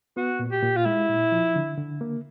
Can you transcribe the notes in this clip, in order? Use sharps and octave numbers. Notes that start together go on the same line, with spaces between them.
B3 F#4
A#2
G4
A#2
F4
G#3 E4
A#2
F3
D3
D3
A#3